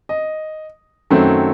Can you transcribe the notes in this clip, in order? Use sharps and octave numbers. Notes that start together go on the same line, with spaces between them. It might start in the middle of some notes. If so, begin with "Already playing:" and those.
D#5
F#2 D#3 F#3 A3 C4